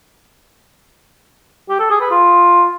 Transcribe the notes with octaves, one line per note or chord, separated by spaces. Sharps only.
G4
A4
G#4
B4
F4